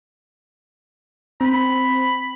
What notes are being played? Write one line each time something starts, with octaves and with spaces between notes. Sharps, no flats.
C4 B5